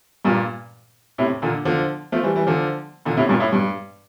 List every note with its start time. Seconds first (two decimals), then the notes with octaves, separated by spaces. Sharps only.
0.25 G2 A#2
1.18 A2 C3
1.42 A#2 D3
1.65 D3 F3
2.12 F3 A3
2.23 E3 G3
2.35 E3 G3
2.47 D3 F3
3.06 A#2 D3
3.17 A2 C3
3.29 G2 A#2
3.40 A2
3.52 G2